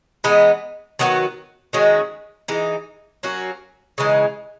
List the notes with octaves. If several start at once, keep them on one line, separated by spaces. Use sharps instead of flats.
E3 G#3 B3 D#4
D#3 F#3 B3 F#4
D#3 G#3 C#4 F#4
E3 G#3 D#4
F#3 A#3 C#4 F#4
C#3 E3 G#3 D#4